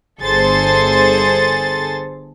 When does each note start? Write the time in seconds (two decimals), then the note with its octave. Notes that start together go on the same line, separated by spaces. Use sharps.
0.23 G1 G#4 A4 C5 A6